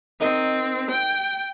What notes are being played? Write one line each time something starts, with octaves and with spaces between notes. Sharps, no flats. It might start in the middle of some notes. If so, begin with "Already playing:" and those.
C4 D#4 A#4 D#5
G5